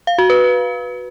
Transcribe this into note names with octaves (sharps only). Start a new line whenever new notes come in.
F5
F#4
B4